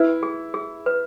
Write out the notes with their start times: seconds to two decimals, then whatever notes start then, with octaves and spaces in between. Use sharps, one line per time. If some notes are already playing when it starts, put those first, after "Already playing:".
Already playing: E4 B4
0.23 G#4
0.54 G#4
0.86 B4